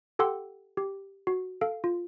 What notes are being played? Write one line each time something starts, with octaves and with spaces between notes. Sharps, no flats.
G4 A4 F#5 G5 C6 E6
G4
F#4
A4 F5
F4